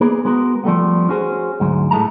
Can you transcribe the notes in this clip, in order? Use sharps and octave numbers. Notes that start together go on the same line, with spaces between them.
A#3 B3 G#4 A#4
G#3 B3 F#4 A#4
F3 G3 A3 B3
C#4 F#4 G#4 C5
D2 G#2 F#3 G#3
A2 G#3 A3 A5 A#5